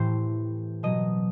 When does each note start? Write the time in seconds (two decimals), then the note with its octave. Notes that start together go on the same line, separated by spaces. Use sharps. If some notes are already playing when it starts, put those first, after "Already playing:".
Already playing: A2 E3 G4 A4 C5
0.83 B2 F#3 D#5